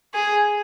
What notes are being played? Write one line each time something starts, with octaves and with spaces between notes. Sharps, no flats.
G#4